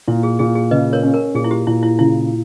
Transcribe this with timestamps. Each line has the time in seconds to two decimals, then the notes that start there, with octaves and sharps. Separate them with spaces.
0.08 A#2 E4
0.23 G#4
0.39 A#2 G#4
0.55 G#4
0.71 C#3 B4 D#5
0.93 A#4 C#5
1.03 C#4
1.14 A#4
1.34 A#2 G#4
1.44 E4
1.51 G4
1.67 A#2 E4
1.83 E4
1.99 C#3 E4